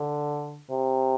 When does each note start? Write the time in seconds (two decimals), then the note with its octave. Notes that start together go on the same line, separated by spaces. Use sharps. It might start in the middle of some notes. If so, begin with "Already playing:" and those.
Already playing: D3
0.70 C3